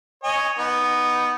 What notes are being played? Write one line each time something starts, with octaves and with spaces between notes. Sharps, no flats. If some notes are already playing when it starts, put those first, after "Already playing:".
C#5 D#5 G#5
B3 D#4